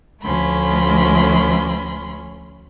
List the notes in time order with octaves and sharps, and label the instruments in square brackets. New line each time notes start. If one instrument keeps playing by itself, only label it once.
[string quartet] D2 F3 A3 C#4 B5 C6